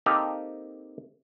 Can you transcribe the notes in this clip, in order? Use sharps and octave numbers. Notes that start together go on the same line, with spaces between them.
A#3 C4 D#4 G4 A4 A#5